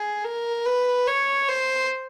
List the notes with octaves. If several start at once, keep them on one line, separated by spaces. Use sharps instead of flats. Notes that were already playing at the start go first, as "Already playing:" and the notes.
Already playing: G#4
A#4
B4
C#5
C5